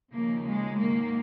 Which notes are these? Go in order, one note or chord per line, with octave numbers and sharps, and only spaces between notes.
D#2 C#3 F3 A#3
G#3
G#2 D#3 A#3